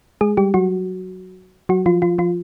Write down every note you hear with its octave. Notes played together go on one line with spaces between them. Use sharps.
G#3 G#4
G3 G4
F#3 F#4
F#3 F#4
F3 F4
F3 F4
F3 F4